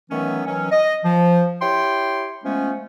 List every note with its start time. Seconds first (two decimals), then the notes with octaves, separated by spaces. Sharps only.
0.10 D#3 E3 F#3 A3 B3 C#4
0.47 D#3 E3 F#3 C#4
0.72 D#5
1.04 F3
1.61 E4 G4 C#5 G5 C6
2.44 F3 G#3 A3 B3 C#4